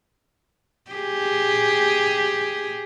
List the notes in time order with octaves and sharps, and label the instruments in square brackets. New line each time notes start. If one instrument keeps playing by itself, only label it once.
[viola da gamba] G4 G#4